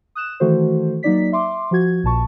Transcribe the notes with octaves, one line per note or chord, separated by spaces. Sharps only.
D#6 F#6 E7
D#3 E3 A3 F#4 A4 C5
F#3 A#3 D#4 D5 B6
E5 C6 D6
F3 F#4 G#6
A#1 A#2 A5 C#6